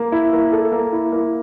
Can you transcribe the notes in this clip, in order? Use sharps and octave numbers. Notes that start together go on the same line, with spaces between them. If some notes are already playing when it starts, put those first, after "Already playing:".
Already playing: A#3
E4
A#3
A4
A#3
E4
A#3